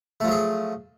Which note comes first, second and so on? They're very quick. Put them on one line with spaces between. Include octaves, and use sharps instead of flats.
A3 F3 F#3 G#4